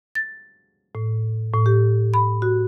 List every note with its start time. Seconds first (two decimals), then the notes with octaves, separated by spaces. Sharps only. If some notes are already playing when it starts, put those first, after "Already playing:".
0.15 A6
0.95 A2
1.54 A2
1.66 G4
2.14 B5
2.42 F#4